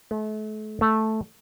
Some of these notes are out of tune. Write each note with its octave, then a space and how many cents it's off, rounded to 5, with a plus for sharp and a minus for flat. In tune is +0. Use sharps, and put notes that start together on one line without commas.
A3 -40
A3 -5